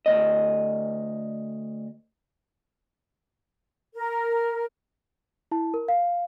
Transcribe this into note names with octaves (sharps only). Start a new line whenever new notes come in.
D2 G2 D#5
A#4
E4 A5
A#4
F5